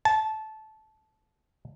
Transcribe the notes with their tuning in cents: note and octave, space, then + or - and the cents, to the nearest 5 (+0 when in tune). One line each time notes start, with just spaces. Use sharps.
A5 -15